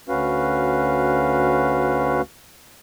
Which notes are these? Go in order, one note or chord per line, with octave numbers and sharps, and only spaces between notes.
D2 C#4 F#4 B4 F5